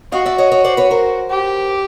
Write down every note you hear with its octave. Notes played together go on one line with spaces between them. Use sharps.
F#4 D#5 F5
D5 E5
C#5 D#5
C#5 D#5
C5 D5
B4 C#5
A#4 C5
G4